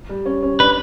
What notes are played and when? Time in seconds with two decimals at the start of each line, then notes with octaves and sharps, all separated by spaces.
0.09 G3
0.26 C#4
0.42 C#4
0.59 D4 B4